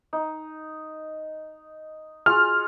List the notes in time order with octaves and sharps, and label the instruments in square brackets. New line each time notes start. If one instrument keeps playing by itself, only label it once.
[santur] D#4
[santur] F4 F#4 G#4 [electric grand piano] F6